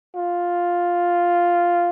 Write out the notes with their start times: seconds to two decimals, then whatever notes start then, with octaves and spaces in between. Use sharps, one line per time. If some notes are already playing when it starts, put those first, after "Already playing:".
0.16 F4